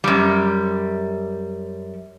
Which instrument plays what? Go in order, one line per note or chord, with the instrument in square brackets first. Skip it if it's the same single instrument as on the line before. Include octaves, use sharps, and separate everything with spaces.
[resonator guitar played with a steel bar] F#2 G3